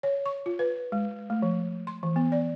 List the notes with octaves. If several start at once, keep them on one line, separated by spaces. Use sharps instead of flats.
C#5
C#6
F4
B4
G#3
A3
F3
C6
E3
B3
D5